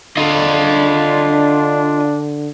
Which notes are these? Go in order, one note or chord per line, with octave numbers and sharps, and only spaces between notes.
D3 D4 F4 D#5